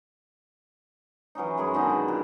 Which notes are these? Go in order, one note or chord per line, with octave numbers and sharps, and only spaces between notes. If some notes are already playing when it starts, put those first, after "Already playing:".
E3 F#3 C#4 D#4
F#2 G#3 G#4
B2 D3 D#3 D#4
B2
A#2